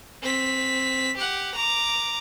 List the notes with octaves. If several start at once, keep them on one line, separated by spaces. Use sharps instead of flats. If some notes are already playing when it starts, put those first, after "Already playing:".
C4 B6
G4 F#5
A#5 D6